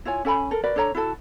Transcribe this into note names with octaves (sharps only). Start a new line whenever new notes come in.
E4 F4 C#5 G#5
C#4 A4 G#5 B5
A4 A#4
F#4 A#4 B4 D5
D4 A4 C#5 A#5
E4 F#4 A4 A5